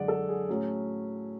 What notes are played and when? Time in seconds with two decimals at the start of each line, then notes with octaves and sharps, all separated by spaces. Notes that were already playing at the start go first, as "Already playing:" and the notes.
Already playing: F#2 D3 G#3 D5 F#5
0.08 A4
0.29 G#4
0.49 A2 F#3 A3 C#4